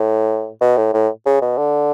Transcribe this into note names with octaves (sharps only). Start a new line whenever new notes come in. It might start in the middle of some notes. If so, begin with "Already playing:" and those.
Already playing: A2
B2
A2
A2
C#3
B2
D3